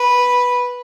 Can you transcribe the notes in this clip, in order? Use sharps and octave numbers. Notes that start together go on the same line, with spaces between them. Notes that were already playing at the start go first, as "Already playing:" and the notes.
Already playing: B4